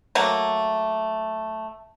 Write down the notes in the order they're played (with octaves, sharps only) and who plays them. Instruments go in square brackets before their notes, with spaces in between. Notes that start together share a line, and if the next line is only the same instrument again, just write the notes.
[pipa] F#3 A3 A#3